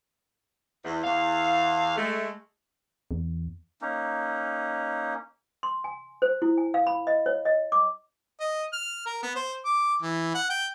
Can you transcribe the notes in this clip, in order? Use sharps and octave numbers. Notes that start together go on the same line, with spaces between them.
E2
E2 F5
G#3 A3
E2
A#3 C#4 D#4
C6
G#5
C5
E4
G#5
F5
B5
D#5
C#5
D#5
D6
D#5
F6
A#4
B3
C5
D6
E3
F#5
G5